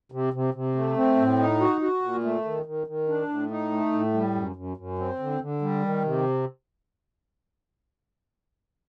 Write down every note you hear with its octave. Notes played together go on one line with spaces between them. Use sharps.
C3
C3
C3
A3
C4
A2
D#4
F#4
F#4
A#2
A3
D#3
D#3
D#3
D4
A2
D#4
A3
A2
G3
F#2
F#2
F#2
C4
D3
D3
G3
D#3
C3